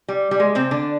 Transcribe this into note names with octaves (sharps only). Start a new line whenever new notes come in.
G3
G3
G#3
C3 C4
D3 D4